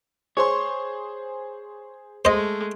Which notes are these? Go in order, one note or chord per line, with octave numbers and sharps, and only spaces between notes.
G#4 C5 C#5 C6
G#3 A3 C5 D#5